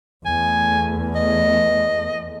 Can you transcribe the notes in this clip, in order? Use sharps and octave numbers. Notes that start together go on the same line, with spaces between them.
E2 A3 G#5
D#5